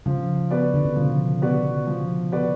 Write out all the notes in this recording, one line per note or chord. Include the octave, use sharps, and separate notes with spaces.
C#3 F3
B3 F#4 B4 D5
D3
C#3
B2 F3
B3 F#4 B4 D5
F3
B3 F#4 B4 D5